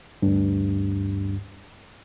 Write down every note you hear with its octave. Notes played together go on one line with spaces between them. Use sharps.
D2 G2